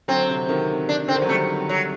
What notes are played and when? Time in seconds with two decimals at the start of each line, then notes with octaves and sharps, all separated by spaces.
0.08 D3 F#3 C4
0.29 C3
0.49 C3 D#3
0.89 D4
1.08 D3 C4
1.15 D#3
1.22 F#3
1.29 D#3 G3 A3
1.69 F#3